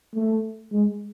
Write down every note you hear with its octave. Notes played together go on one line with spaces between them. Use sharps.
A3
G#3